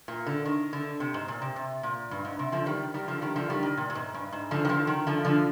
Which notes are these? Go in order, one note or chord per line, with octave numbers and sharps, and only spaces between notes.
A#2
D3
D#3
D3
C3
G#2
A#2
C3
C3
A#2
G2
G#2
C3
D3 F3
D#3 G3
D#3 G3
D3 F3
D#3 G3
D3 F3
D#3 G3
D#3
A#2
A#2
G#2
G2
G#2
D3 F3
D#3
D3 F3
D#3
D3 F3
D3 F3